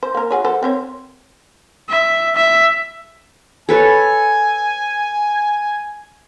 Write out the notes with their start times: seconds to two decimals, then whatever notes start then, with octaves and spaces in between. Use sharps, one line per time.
0.03 C5
0.15 A#3 A#4
0.31 F#4 G#4 C#5
0.44 F#3 A4 C5
0.63 C4 C5 C#5
1.89 E5
2.36 E5
3.69 A4 B4 C#5 G#5